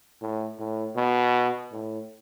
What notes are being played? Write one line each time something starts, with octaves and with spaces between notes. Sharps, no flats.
A2
A2
B2
A2